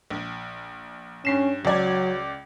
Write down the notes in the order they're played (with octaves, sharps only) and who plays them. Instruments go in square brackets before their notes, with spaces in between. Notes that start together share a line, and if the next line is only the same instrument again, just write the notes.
[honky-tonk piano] A#1
[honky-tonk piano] G2 C7 E7 [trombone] C#4
[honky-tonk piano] C#2 D5 G#6 [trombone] F#3